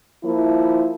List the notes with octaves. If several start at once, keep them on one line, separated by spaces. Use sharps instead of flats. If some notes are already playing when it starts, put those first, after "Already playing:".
F3 A#3 E4